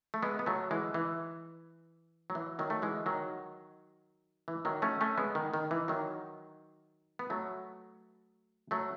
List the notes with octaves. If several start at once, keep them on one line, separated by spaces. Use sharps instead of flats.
A3
G#3 B3
B3
F#3 A3
E3 G#3
E3
F#3
E3
D#3 F#3
A3
E3 G#3
D#3 F#3
E3
D#3 F#3
A3 C#4
A3 C#4
G#3 B3
D#3
D#3
E3
D#3 F#3
B3
F#3 A3
F#3 A3